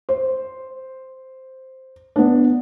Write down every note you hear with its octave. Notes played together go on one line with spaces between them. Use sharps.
C5
B3 D4